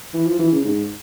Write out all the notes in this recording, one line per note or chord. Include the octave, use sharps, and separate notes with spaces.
E3
F3
E3
C#3
G#2